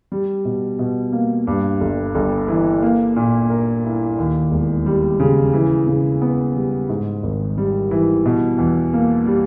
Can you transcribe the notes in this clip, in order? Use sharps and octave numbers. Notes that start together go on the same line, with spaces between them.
G3
B2
B2
A#3
G2
G1
G1
E3
A#3
A#2
A#4
E4
D#2
E1
G3
C#3
E3
C#3
B3
G3
G#2
G#1
G3
E3
B2
E2
A#3
G3